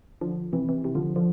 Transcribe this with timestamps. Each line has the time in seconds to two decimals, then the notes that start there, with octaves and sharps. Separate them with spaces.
0.21 D3 F3
0.53 C3 E3
0.69 C3 E3
0.84 C3 E3
0.95 D3 F3
1.16 D3 F3